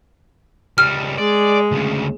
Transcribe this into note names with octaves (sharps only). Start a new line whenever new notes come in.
C#2 G3 F6
G#3 D5
D2 C#3